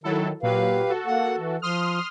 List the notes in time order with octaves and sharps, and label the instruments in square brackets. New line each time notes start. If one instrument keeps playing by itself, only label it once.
[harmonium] D#3 [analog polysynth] F#3 E4 A4
[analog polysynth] A#2 F#3 [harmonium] G4 B4 F5
[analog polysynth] F#4 A4
[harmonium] A#3 F#5
E3
[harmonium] F3 [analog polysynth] C6 D#6 F6